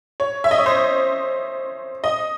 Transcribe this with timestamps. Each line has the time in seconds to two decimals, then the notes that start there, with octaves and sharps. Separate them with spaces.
0.20 C#5
0.44 E5
0.51 D#5
0.58 C#5
0.66 C5
2.04 D#5